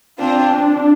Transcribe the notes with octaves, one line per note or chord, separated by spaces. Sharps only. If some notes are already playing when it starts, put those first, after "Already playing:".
C4 D4 F4
D4